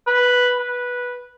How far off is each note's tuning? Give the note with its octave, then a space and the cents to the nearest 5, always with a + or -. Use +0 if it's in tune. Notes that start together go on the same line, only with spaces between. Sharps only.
B4 +0
B4 -10